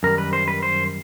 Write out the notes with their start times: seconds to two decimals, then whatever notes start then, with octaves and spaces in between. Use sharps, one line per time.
0.03 F#2 D#3 G3 A#4
0.18 B4
0.33 C5
0.48 B4
0.62 C5